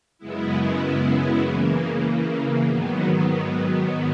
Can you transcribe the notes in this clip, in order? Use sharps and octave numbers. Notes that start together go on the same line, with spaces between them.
F#2 C#3 G#3 B3 E4
C#3 E3 A#3
G#2 D#3 F#3 B3